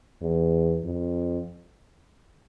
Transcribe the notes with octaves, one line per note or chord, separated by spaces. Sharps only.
E2
F2